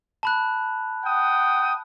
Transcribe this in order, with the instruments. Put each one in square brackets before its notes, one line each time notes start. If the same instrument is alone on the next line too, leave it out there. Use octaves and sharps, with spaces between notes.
[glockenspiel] A5 B5 F#6
[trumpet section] F#5 G5 D#6